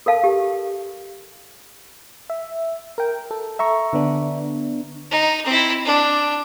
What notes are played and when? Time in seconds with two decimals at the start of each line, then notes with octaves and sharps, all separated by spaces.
0.06 A4 A#4 F5 A5
0.24 G4
2.30 E5
2.98 A#4 G5
3.31 A4
3.59 E5 A#5 C#6
3.93 D3 B3 D4
5.11 D#4
5.46 C4 E4
5.85 D4